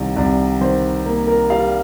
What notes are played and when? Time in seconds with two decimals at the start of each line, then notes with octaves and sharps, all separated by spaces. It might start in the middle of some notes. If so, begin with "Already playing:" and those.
Already playing: C2 D#3
0.16 C2 D5
0.61 D#3 C5
1.06 A#3
1.27 A#4
1.50 G3 F5